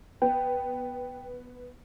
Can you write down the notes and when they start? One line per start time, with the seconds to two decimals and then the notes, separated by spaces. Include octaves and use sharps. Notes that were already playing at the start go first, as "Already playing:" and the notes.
0.22 B3 G5